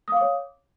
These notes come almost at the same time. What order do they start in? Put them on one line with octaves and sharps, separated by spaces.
D#6 F5 D6 C#5